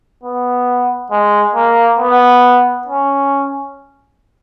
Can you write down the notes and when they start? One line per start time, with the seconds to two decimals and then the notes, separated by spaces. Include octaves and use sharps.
0.23 B3
1.11 G#3
1.55 A#3
1.99 B3
2.87 C#4